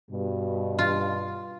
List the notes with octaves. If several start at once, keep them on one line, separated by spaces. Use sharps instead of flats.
G2 B2
F4